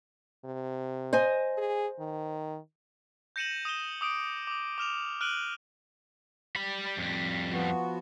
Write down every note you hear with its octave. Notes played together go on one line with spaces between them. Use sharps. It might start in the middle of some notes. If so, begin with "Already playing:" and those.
C3
C5 D#5 G#5
G#4
D#3
G6 A#6 C#7 D#7 E7 F#7
D#6 D#7 E7 G7
D6 D#6 D7
D6 D#6
D6 F6 E7 F7
F6 F#6 D7 D#7 F#7 G7
G3 B5
F2 G3
F3 B3 F#4